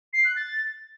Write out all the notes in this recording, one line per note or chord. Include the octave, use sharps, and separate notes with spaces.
C7
F#6
A6